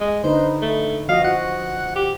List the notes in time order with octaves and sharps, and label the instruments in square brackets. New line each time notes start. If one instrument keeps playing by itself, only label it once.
[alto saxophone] G#3
[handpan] D3 D#4 B4 [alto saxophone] C5
[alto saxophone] A3
[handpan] F3 F#4 D#5 [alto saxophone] F5
[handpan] F#4 [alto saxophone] F#5
[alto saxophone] G4